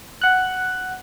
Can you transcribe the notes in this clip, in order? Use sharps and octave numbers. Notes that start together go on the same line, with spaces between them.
F#5 F#6